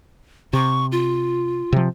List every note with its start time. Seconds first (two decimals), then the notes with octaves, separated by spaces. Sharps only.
0.53 C3 C#6
0.92 F4
1.73 C3 F3